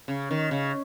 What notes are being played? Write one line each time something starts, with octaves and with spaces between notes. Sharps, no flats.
C#3
D#3
C#3